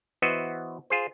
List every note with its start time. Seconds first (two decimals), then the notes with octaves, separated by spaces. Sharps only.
0.22 E3 B3 F#4 C5 D#5 E5
0.90 F4 G#4 C5